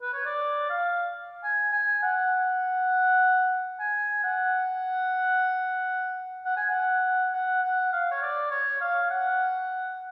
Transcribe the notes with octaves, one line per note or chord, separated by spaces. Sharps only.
B4
C#5
D5
F5
G#5
G#5
F#5
G#5
F#5
F#5
G#5
F#5
F#5
F#5
F5
C#5
D5
C#5
F5
F#5